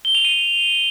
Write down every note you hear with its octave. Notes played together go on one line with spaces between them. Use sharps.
G7
F7
D#7